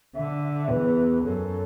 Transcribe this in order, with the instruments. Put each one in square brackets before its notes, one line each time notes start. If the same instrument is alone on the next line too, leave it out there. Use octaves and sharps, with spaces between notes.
[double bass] D3 [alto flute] E5
[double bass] E2 [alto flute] B4
[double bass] F#2 [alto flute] A4